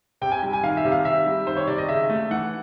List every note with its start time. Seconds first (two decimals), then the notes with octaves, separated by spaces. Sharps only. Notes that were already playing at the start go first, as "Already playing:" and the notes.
0.21 C3 G5
0.32 G#5
0.43 G3
0.53 G#5
0.63 D#3 F5
0.77 E5
0.85 C3
0.92 F5
1.05 C3 E5
1.26 G3
1.47 D#3 C5
1.57 C#5
1.67 C3 D5
1.78 D#5
1.88 C#3 E5
2.09 A3
2.31 E3 F#5